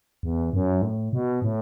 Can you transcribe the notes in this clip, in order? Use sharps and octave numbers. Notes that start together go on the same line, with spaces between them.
E2
F#2
A2
B2
A2